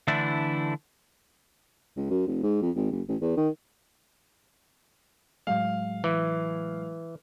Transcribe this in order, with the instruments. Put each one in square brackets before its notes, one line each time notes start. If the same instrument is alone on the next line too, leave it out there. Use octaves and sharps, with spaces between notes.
[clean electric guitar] D3 E3 A3 D4 E4
[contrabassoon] C#2
F#2
F1
G#2
F2
G#1
F#1
A1
E2
D#3
[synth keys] A2 F#3 G#3 [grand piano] F5
[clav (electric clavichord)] E3